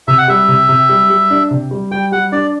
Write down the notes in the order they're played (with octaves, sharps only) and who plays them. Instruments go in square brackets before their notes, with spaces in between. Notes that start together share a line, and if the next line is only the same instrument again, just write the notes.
[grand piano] C3 [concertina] E5
[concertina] F#5
[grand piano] G3 [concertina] E5
[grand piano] C3
C3
G3
G3
D4
C3
G3
[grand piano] G3 [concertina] G5
[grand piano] G3 [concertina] F#5
[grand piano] D4 [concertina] D5